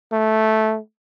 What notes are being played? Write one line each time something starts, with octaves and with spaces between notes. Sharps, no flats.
A3